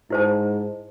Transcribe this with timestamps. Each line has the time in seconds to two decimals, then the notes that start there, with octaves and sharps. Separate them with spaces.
0.10 G#2 E4 C5 A5